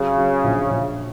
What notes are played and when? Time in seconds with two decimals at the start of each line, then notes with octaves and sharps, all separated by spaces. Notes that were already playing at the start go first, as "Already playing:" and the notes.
Already playing: C#3 F#3
0.18 F#3
0.44 A#1
0.70 A#1